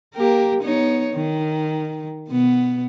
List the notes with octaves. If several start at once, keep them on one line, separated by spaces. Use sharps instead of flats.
A#3 G4 A#4
B3 D#4 C#5
D#3
B2 B3